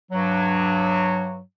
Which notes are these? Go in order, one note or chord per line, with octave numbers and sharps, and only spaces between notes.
G2 F#3